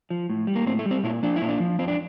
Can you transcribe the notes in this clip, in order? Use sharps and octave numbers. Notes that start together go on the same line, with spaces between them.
F3
A2
G3
A#3
A2 C4
A3
G3
C4
A#2 E4
F3 D4
E4
A#2
D4
F3
F2 C4
D4